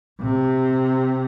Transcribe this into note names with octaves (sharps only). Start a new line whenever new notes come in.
C3